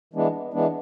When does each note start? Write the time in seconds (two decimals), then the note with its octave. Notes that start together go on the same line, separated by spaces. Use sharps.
0.14 E3 G#3 B3 D4
0.54 E3 G#3 B3 D4